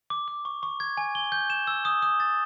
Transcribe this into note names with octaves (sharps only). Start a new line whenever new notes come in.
D6
D6
C#6
C#6
G#6
G#5
G7
G6
E7
E6
D#6
D#6
A6